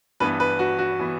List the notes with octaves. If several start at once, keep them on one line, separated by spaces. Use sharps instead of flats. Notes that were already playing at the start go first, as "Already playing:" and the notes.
G2 E3 B3 B4
B4
F#4
F#4
E3 B3